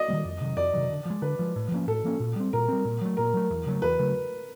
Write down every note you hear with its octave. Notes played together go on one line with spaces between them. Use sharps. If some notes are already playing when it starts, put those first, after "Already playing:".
Already playing: D5 D#5
D#3 G3 A#3
F2
C3 D#3 F#3
F2 D5
C3 D#3 F#3
D3
F3 G#3
D3 B4
F3 G#3
A2
F3 A#3 C#4
A2 A4
F3 A#3 C#4
A#2
G3 C4
A#2 A#4
G3 C4
A#2
F#3 A3
A#2 A#4
F#3 A3
E2
C#3 F#3 A3
E2 B4
C#3 F#3 A3